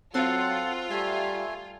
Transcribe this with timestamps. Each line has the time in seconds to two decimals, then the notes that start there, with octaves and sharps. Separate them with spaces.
0.14 F#3 C4 F4 A4 F#5 C6
0.90 G3 A3 E5 G#5